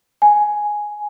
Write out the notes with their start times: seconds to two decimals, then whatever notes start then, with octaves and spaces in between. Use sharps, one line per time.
0.22 G#5